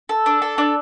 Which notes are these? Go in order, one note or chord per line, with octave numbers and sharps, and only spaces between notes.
A4
D4
A4
D4